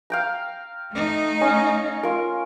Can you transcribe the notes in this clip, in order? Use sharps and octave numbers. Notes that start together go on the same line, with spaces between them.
F5 G5 A#5
A3 D#4
C#4
F4 A#4